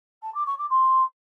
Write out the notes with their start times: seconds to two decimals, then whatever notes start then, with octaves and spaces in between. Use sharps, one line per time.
0.22 A5
0.34 D6
0.46 C#6
0.58 D6
0.70 C6